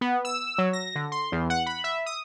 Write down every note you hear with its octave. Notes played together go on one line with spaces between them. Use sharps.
B3
E6
F#3
A#6
D3
C6
E2
F#5
B5
E5
D#6